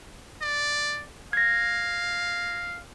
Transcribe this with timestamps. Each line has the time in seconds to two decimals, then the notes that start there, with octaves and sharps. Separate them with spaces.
0.42 D5
1.33 F5 G#6 A#6